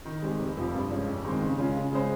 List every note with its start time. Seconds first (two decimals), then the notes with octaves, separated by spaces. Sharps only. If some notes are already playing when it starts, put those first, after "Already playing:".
0.05 D#3
0.22 G#3 C4 G4
0.39 F1
0.57 F2 C3 F3
0.73 G2
0.90 F3 G#3 C#4
1.07 F2
1.24 D#3 G#3 C4
1.42 C#3
1.58 G#3 C#4 F4
1.76 C#3
1.92 G#3 C#4 G#4 C5